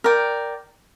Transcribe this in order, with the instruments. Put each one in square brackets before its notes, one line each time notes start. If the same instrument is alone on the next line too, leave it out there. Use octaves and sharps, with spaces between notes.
[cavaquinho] A#4 D5 G5